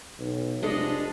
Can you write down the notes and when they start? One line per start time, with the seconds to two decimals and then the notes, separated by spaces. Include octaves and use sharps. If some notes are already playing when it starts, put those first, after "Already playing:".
0.19 B1
0.62 F1 G#3 D4 G4 A4 D5 D#5